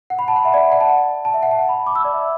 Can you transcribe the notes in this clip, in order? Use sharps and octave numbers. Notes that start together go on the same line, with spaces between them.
F#5
B5
A5
F#5
E5
D5
F#5
A5
A5
E5
F#5
A5
B5
D6
E6
D5
E5